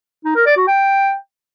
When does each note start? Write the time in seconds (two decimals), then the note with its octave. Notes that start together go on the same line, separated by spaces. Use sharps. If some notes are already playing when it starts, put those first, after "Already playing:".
0.25 D#4
0.35 A#4
0.46 D5
0.57 F#4
0.67 G5